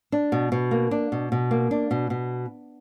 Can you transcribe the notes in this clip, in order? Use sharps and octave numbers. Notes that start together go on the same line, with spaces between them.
D4
B2
B2
A#3
D4
B2
B2
A#3
D4
B2
B2